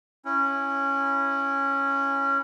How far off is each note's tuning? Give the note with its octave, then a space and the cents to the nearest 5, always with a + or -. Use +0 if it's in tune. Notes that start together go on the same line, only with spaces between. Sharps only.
C#4 -10 E4 +0